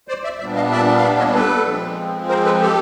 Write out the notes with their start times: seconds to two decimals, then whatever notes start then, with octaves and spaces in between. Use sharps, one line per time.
0.08 C5 D5
0.24 D5 E5
0.40 A#2 G3 B3 D4 D5 E5
0.55 D#5 F5
0.71 D5 E5
0.96 F5
1.03 D5 E5
1.18 C#5 D#5
1.34 A4 B4
1.66 F3 G#3 C4
2.29 A#4 C5
2.45 A4 B4
2.60 G4 A4